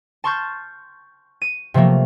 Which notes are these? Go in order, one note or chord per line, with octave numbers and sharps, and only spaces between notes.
A5 C6 C#6 F6 G6 A6
D#7
C3 F3 F#3 A3 A#3